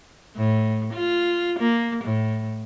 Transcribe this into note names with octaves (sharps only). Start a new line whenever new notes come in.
A2
F4
A#3
A2